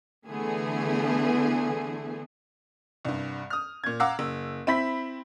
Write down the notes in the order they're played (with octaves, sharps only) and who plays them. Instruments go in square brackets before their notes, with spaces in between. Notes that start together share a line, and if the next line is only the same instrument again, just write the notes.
[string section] D3 E3 A3 B3 G#4
[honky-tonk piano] C2 G2
D#6 F6
A#2 G#6
F5 F#5 A#5 D6 E6
F#1
C4 E4 B5 B6